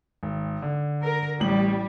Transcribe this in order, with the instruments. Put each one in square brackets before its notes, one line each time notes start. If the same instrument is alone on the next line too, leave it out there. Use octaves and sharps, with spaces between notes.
[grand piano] G#1
D3
[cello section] A#4
[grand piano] A1 A2 F#7 [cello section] G3